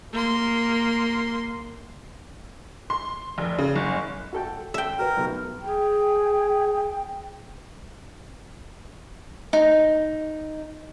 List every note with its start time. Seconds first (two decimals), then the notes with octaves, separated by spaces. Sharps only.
0.12 A#3 C6
2.90 C6
3.38 F1
3.58 C#3
3.76 F#1
4.33 F#4 A4 G5
4.74 A4 E5 G5
4.99 F#4 A#4 B4
5.17 B1 B2
5.61 G#4 G5
9.53 D#4